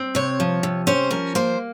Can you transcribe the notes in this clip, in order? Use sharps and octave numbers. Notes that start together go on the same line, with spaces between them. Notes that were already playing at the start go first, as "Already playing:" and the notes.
Already playing: C4
C3 C#5
F3
C3
C#4 C5
F3 A#4
A#3 C5